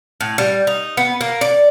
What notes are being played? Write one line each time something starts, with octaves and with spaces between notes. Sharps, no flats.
A2
G3
D#4
B3
A#3
D5